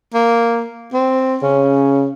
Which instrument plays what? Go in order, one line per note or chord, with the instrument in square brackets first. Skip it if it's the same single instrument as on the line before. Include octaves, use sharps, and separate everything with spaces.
[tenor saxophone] A#3
C4
[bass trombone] C#3 [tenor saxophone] C#4